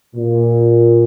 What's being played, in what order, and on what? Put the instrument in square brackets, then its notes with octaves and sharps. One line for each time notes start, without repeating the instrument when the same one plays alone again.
[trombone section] A#2